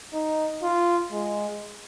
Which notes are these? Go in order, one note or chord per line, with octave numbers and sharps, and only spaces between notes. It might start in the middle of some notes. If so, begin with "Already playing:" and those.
D#4
F4
G#3